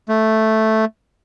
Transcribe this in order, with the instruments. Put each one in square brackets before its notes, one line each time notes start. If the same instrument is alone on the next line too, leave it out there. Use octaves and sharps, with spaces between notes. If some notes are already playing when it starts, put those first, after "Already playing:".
[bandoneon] A3